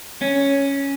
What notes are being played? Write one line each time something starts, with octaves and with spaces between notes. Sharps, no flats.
C#4